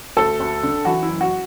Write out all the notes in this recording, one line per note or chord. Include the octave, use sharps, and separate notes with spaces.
D2 A4
D2
D3
E3 F#4
E4
F#1
F#4